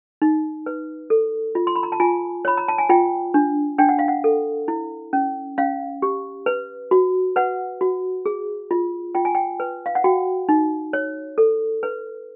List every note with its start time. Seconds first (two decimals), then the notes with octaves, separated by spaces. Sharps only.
0.22 D#4
0.66 B4
1.10 A4
1.55 F4
1.67 C6
1.76 B5
1.83 A#5
1.92 A5
2.00 F4 G#5
2.45 C#5 B5
2.58 A#5
2.68 A5
2.78 G#5
2.89 F4 G5
3.34 D4
3.78 D4 G5
3.89 F#5
3.99 F5
4.08 F#5
4.24 A4
4.68 E4
5.13 C#4
5.58 C#4 F5
6.02 G4
6.46 B4
6.91 F#4
7.36 B4 F#5
7.81 F#4
8.26 G#4
8.71 F4
9.15 F4 G5
9.25 G#5
9.35 G5
9.60 B4
9.86 F5
9.95 F#5
10.04 F#4 G5
10.49 D#4
10.93 C#5
11.38 A4
11.83 B4